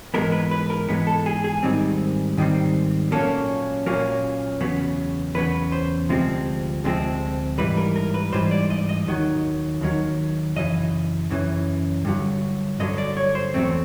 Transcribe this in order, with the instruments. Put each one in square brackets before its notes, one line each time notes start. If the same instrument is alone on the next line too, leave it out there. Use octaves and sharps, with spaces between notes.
[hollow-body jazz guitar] G#2 E3 G#3 B3 A#4
B4
B4
A#4
G#2 E3 G#3 B3
A4
G#4
G#4
G#2 D#3 G3 C4
G#2 D#3 G3 C4
A#2 F#3 A#3 C#4 A4
A#2 F#3 A#3 C#4
E2 C#3 F#3 B3
E2 C#3 F#3 B3 B4
C5
D2 C3 F3 G#3 C4
D2 C3 F3 G#3 C4
G#2 E3 G3 B4
A#4
A#4
B4
G#2 E3 G3 C5
D5
D#5
D#5
D#2 D#3 F#3
D#2 D#3 F#3
F#2 C#3 E3 D#5
F#2 C#3 E3
G2 D3 F#3
G2 D3 F#3 D#5
D5
C#5
C5
E2 B2 F#3 A3 C4